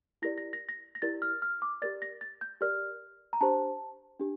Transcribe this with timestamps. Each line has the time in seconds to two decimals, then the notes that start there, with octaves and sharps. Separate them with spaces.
0.22 E4 G4 A#4 D5 A#6
0.38 A#6
0.53 A#6
0.69 A#6
0.95 A#6
1.02 E4 G4 A#4 D5 A6
1.22 F6
1.42 F6
1.62 D6
1.82 G4 A#4 D5 A6
2.02 A#6
2.21 A6
2.41 G6
2.61 G4 A#4 D5 F6
3.33 A#5
3.41 D4 G4 C5 A5
4.19 D4 G4